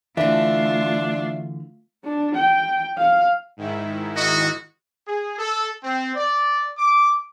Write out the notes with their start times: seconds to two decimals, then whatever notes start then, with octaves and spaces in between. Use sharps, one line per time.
0.17 D3 E3 A3 D4 F4 E5
2.04 D4
2.35 G5
2.98 F5
3.57 G#2 D#3 E4
4.16 F#4 D#5
5.07 G#4
5.38 A4
5.83 C4
6.16 D5
6.78 D6